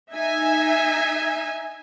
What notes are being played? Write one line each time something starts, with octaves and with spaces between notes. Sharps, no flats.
D#4 E5 G#5